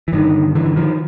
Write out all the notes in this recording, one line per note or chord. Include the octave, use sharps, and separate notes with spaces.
E3
G2 D3 D#3
D3 E3
D#3 F3